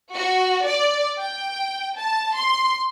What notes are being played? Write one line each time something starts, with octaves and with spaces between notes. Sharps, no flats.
F#4
D5
G5
A5
C6